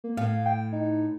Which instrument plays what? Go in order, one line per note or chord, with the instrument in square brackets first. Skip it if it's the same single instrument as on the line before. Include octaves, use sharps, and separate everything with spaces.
[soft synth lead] A#3
[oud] A2 [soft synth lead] F5
[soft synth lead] G5
D#4